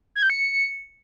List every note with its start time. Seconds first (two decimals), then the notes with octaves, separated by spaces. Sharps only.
0.15 G#6
0.23 G6
0.30 C#7